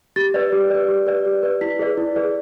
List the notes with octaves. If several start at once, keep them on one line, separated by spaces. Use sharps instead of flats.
G4 A6
B4 D5
G4
B4 D5
G4
B4 D5
G4
B4 D5
E4 B6
G#4 B4 D5
E4
G#4 B4 D5